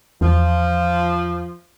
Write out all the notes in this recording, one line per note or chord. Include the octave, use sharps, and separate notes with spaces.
E2 F3